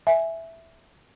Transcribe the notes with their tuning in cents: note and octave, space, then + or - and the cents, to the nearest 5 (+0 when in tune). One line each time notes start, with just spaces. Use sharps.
E5 +0 G#5 +0